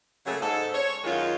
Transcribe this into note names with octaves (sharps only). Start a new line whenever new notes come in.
C#3 F#3 A3 A#3 G#4
G#2 A4
C#5
F#2 D#3 G#3 F4